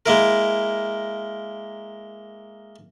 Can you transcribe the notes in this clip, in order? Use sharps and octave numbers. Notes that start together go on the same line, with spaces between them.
G#3 A#3 E4 A#4